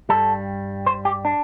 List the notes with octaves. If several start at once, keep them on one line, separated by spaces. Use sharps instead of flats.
G2 G3 A4
C5
G4
D4